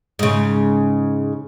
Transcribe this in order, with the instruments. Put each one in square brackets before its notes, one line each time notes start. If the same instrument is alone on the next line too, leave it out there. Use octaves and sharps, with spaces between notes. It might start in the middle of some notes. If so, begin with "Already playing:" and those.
[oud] G#2 C#3